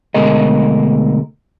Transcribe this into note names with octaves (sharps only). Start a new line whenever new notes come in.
D2 B2 G#3 A3 A#4 D#5